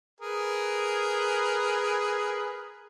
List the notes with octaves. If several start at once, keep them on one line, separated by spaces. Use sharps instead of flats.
G#4 A#4 B4